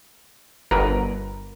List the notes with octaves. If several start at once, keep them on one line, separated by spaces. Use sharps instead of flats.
G1 A#4 B4